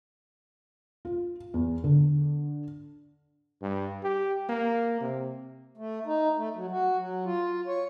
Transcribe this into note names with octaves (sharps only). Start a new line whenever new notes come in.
F4
E2
D3
G2
G4
A#3
C3
A3
D#4
A3
F#3
F#4
F#3
F4
C#5